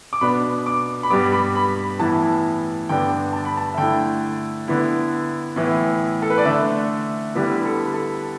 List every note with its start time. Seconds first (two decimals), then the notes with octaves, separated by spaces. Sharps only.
0.13 D6
0.21 B2 B3 D4 B5
0.66 D6
1.03 B5
1.10 G2 G3 B3 D6
1.32 B5
1.55 B5
1.99 A2 E3 B3 E4 A5
2.89 G2 D3 B3 D4 G5
3.33 A5
3.45 B5
3.57 A5
3.74 E5
3.77 D3 A3 E4 G5
4.68 D3 B3 E4
5.56 A2 E3 B3
6.22 A4
6.30 B4
6.38 D5
6.45 D3 A3 D4 E5
7.35 D3 G3 B3 E4 B4
7.65 A4
7.94 A4